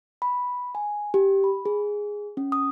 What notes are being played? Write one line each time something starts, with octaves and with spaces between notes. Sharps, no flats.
B5
G#5
G4
B5
G#4
C#4
D#6